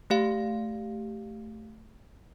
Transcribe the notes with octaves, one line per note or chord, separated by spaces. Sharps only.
A3 G4 F5